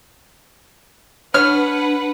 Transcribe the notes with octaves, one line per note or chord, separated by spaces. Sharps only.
D4 B4 C#5 F#5 F6